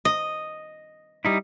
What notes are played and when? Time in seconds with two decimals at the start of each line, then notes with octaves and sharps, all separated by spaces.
0.05 D#5
1.25 G3 D#4 E4